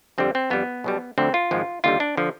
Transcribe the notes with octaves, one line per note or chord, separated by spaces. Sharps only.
F2 D3 G3 C4
C4
F2 D3 G3 B3
B1 B2 G3
D2 D3 F3 C4
F4
G#1 G#2 F3 G#3
D#2 D3 G3 F4
D4
D3 F3